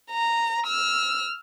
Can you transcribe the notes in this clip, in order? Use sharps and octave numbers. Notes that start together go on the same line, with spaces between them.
A#5
E6 F6